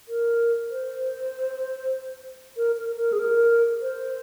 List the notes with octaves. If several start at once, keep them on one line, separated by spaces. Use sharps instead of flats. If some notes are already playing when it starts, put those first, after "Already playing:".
A#4
C5
A#4
A#4
A#4
G#4
A#4
C5